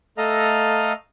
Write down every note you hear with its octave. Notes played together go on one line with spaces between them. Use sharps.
A3 A4 D#5 F5 A#5